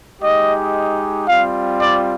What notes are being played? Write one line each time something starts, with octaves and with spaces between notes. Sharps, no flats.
G#3 D#4 G4 D#5
G3 C4 F4 F5
D5